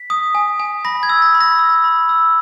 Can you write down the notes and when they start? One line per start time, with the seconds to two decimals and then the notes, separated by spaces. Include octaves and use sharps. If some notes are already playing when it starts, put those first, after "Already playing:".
Already playing: B6
0.10 D#6
0.35 G#5
0.59 G#5
0.85 B5 A#6
1.03 G#6
1.09 E6
1.22 A#6
1.34 B5
1.41 A#6
1.59 E6
1.84 B5
2.09 E6